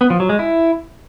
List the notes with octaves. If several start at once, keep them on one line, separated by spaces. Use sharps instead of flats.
B3
F3
F#3
G#3
E4